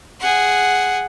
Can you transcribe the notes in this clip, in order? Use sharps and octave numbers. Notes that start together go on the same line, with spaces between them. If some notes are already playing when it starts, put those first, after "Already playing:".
G#4 F#5